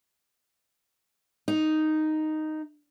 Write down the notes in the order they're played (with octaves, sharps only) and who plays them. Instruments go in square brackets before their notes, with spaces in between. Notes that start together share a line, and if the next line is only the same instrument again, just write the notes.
[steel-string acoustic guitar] D#4